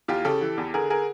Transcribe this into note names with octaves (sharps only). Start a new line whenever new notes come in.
E2 F4 G4
C#3 G4 A4
E3
E2
D3 G#4 A#4
G#4 A#4